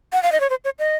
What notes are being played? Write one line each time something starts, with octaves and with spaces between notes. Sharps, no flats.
F#5
F5
D#5
C#5
C5
C#5
D#5